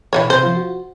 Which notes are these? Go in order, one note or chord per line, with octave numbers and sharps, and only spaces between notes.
B2 E3 E4 F#4 C#5
C3 C5
F3 F4
F#4